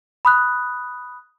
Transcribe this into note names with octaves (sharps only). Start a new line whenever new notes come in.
B5 D#6 F#6